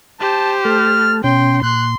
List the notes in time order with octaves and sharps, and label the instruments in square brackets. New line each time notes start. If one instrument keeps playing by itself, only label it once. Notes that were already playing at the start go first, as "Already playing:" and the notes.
[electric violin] G4 C5 [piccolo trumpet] A5
[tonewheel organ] A3 A5 [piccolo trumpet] F6
[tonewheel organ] B2 C#4 [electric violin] G5 [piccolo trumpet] C6
[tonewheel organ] A#2 [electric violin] C6 [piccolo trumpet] F#6